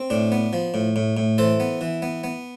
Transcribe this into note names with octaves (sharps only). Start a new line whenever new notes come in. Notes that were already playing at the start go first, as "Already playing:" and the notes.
Already playing: C4
A2 D4
B3
F3
A2
A2
A2
E3 A4 C5
B3
E3
B3
B3